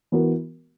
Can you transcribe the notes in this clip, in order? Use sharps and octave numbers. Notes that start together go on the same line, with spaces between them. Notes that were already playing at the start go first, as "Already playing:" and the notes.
E3 B3 F#4 A#4